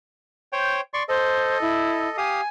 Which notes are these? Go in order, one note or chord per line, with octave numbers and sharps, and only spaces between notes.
C5 C#5 G5
D5 C6 C#6
A4 C5 D#5
E4
G4 F5 G#5 D#6